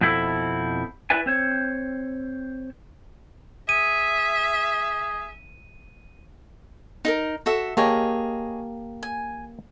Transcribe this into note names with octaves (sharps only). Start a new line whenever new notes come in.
F2 B2 C4 E4 A4
E4 B4 D5 E5 G#5
C4 C5 C#5
G#4 E5 D#7
D#4 G#4 A#4
F#4 A4 E5
A#3 G4 G#4 C#5 D#5 A5
G#5